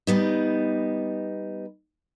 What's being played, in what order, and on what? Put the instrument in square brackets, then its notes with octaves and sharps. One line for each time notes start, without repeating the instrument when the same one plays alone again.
[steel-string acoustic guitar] G3 B3 D#4